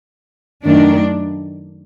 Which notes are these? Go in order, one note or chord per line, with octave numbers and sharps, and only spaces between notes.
F#2 D#3 A3 D4